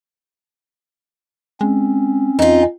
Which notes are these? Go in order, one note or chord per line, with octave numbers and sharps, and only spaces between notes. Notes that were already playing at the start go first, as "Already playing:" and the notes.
G#3 C4 C#4
E2 D#4 F4